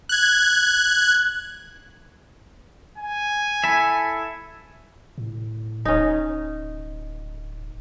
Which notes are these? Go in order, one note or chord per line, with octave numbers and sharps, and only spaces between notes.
F#6 G#6
G#5
E4 A4 E5
A2
D1 C#4 D#4